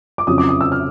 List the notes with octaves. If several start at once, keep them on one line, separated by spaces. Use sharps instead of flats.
D6
F2 C#3 F#3 D#6
D6
D#6
E6
F6